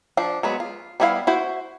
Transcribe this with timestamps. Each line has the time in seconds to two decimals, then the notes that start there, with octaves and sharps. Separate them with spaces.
0.17 F3 D4 A5
0.43 F#3 G#3 B3
0.60 F4
1.00 G3 B3 E4 G#4 F5
1.27 E4 F#4 C5